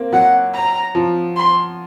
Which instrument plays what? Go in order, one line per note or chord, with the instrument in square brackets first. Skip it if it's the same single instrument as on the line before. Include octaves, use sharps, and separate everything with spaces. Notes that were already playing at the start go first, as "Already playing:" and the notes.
Already playing: [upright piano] A#3 C4
[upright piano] F#3 [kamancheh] F#5
[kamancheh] A#5
[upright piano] F3
[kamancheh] C6